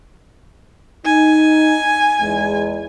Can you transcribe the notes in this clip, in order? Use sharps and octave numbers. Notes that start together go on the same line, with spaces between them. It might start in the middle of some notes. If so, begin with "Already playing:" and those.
D#4 G#5
E2 G#3